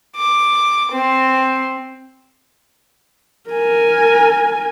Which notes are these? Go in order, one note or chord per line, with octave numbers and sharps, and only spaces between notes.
D6
C4
A#4 G#5